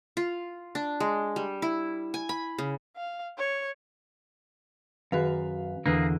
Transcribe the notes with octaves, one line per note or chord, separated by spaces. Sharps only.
F4
D4
G#3
G3
E4
G#5
B5
C#3
F5
C#5
F#2 D#3 F#4 G#4 B4 F5
E2 D3 A#3 D4 G#4 B4